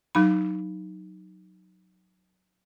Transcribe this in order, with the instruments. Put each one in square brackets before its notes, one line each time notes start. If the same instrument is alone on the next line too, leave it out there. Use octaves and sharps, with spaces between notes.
[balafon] F#3 D#4 B5